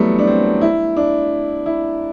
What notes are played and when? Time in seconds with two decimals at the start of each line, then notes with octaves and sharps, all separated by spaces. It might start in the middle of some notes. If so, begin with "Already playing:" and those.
Already playing: E3 F#3 G3 A3 B3
0.19 D4
0.27 C4
0.61 E4
0.97 D4
1.66 E4